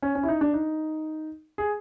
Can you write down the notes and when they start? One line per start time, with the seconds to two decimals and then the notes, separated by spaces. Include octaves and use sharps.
0.02 C#4
0.15 C#4
0.23 E4
0.28 D#4
0.41 D4
0.53 D#4
1.58 G#4